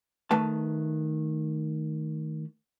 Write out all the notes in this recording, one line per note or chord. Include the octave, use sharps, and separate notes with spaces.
D#3 A3 B4 A5